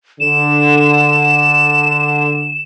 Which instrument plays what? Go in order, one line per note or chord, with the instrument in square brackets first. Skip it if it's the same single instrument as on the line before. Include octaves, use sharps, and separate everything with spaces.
[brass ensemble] D3 [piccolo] E7